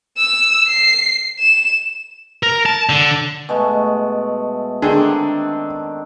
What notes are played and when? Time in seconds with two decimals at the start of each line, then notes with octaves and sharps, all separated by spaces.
0.18 E6
0.69 C7
1.39 E7
2.43 A#4
2.66 A5
2.89 D3
3.49 B2 G#3 A3
4.82 D3 D#3 C4 D4 G#4